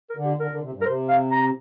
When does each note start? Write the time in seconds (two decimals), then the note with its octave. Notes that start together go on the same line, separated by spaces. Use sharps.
0.10 A#4
0.17 D3
0.25 G4
0.39 D3 A#4
0.51 D3
0.63 C3
0.74 G2
0.82 A#4
0.86 C3 C5
1.09 F5
1.31 A#5